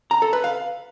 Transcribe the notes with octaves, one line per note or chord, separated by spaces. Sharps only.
A#5
A4
B4
F5